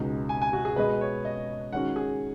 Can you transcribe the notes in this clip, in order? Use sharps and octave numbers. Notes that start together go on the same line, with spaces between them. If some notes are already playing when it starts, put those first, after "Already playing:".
Already playing: C#2 B2 G#3 D#4
G#5
G#5
F#4
G#4
B2 G#3 B3 G#4 B4 D#5
C#5
D#5
D#3 G#3 C#4 F#4 F#5
G#4